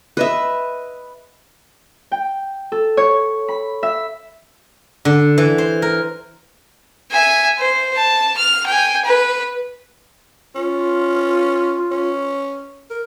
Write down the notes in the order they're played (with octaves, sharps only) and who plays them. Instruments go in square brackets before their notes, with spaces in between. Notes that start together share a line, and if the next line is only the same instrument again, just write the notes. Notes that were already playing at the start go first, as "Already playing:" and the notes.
[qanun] B4 D#5 E5
[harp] G5
A4
C#5
B5
E5
[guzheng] D3
E3
C5
A#4
[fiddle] E5 G#5
C5
A5
F6
G5 G#5
B4
[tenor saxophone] C#4 [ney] F4
[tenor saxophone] C#4
A#4